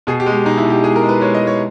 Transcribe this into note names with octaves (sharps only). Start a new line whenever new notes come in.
B2 G#4
G4
G#3
G4
B2 D#4
E4
B2
G4
G#3 G#4
A#4
G#3
B4
G#3 C#5
D#5
G#3
C#5